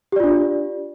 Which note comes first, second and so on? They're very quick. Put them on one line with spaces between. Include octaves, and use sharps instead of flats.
G4 D5 F4 D4